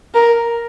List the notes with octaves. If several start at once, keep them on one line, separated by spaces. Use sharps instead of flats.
A#4